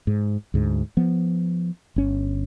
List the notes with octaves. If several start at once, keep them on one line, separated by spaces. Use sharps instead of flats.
G#2
D2 G#2
F3 B3
G1 C#4